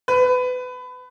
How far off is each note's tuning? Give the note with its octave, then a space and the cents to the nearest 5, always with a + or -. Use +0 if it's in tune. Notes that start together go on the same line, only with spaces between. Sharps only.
B4 +25